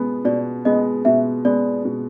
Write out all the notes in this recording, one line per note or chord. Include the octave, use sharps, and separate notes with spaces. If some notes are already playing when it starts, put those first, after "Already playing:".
Already playing: B2 G#3 B3
B2 D5
G#3 B3 D#5
B2 E5
G#3 B3 D5
B2